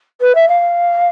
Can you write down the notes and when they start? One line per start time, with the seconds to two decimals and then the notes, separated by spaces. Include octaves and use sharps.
0.21 B4
0.35 E5
0.48 F5